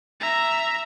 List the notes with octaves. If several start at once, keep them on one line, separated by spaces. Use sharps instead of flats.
E5 A#5